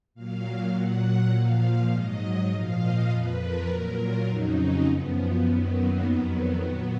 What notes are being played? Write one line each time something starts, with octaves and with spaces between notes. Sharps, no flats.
A#2 F#3 F5
A#2 F#3 F#5
A#2 F3 F5
G#2 F#3 D#5
A#2 F3 F5
D#5
F2 F3 B4
A#4
A#2 F#3
F4
F2 C#3 F#3 D#4
C#4
F#2 F3 B3
F#2 D#3 F#3
A#3
F2 D#3 F#3 B3
A#2 F#3